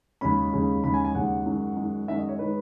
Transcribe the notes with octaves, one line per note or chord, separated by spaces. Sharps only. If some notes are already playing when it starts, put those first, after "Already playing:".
D#2 C#3 G#3 C#4 B5
D#2 C#3 G#3 C#4
D#2 C#3 G#3 C#4 B5
G#5
G#5
D#2 C#3 G#3 C#4 F#5
F#2 D#3 G#3
F#2 D#3 G#3
F#2 D#3 G#3 E5
D#5
C#5
D#3 G#3 B4